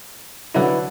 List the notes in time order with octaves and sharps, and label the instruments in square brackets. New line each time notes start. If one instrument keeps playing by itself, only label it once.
[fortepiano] D3 F#3 D4 [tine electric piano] E4 B4